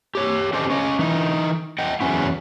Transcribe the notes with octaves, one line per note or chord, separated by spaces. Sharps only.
G4 C#5
C#4 D4 G4 A4 C5 D#5
C#4 C#5 D#5
E3 D#4
D#5 F#5 G5
E2 F#3 C#4 E4